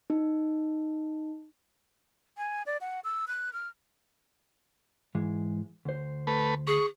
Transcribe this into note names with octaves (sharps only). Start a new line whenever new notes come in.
D#4
G#5
D5
F#5
E6
F#6
F6
G#2 E3 G#3
D2 C5
A3 B4
G#4 C#6